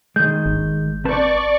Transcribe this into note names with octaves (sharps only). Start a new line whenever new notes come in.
D#3 G#3 G6
G#1
C4 B4 D5 A5 C#6